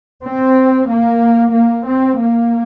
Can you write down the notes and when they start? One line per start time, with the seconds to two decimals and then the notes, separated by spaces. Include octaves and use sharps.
0.23 C4
0.88 A#3
1.53 A#3
1.86 C4
2.19 A#3